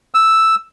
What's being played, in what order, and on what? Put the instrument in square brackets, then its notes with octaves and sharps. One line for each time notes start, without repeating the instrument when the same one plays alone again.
[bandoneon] E6